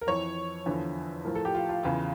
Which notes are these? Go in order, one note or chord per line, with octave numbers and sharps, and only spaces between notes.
A#4
F2 E3 C#5
E2 D3 F3
A2 F3 A#4
A4
G4
F4
F4
E2 C#3 E3 F4